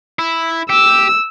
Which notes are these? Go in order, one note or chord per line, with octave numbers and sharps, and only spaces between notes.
E4
G4 E6